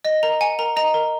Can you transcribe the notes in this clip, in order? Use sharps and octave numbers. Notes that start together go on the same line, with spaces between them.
D#5 A#6
A#4 A#5
F#5 G#5
A#4 A#5
D#5 A#5
A#4